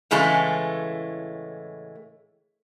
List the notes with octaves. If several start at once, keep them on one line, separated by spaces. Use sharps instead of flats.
A2 C#3 E3 G#3 A3